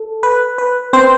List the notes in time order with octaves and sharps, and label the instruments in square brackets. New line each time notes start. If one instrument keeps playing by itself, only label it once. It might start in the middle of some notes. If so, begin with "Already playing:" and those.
Already playing: [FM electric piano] A4
B4
B4
C4 C5